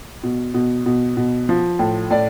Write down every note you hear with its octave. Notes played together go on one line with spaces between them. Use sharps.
B2
B2
B2
B2
F3
A2
A2 D5